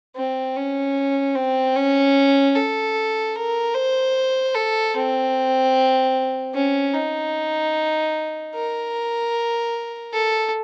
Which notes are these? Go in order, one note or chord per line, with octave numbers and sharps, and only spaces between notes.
C4
C#4
C4
C#4
A4
A#4
C5
A4
C4
C#4
D#4
A#4
A4